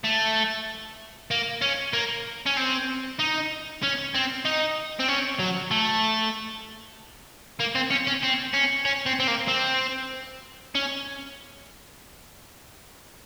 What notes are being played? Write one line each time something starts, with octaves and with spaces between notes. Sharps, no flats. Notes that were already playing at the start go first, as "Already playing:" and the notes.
A3
A#3
C#4
A#3
C#4
C4
D#4
C#4
C4
D#4
C4
C#4
F#3
A3
A#3
C4
C#4
C#4
C4
C#4
C#4
C4
C4
A#3
C4
C#4